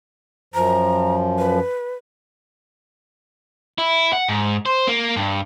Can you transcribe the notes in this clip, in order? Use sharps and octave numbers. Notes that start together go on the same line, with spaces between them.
F#2 F3 A#5
B4
E4
F#5
G#2
C5
A#3
G2